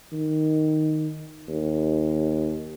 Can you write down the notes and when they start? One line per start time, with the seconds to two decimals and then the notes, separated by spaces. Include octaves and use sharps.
0.12 D#3
1.48 D#2